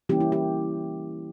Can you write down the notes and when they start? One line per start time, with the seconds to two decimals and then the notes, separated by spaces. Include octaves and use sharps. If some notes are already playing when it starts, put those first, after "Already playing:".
0.09 E3 G3 A#3 C#4 E4 G4
0.20 E4
0.32 G4